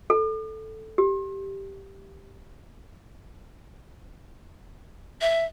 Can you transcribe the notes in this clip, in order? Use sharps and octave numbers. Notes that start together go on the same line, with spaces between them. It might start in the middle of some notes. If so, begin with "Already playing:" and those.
A4
G4
E5